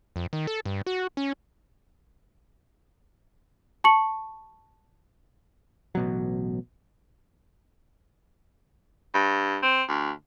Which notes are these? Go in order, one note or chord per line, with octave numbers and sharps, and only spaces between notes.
F2
D#3
A4
G2
F#4
C#4
A5 C#6 C#7 F#7
A1 B2 F#3
G2
C4
D2